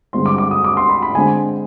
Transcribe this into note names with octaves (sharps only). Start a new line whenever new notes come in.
G2 D3 G#3 C4 C6
D6
D6
D#6
D6
C6
B5
B5
D3 G#3 C4 G#5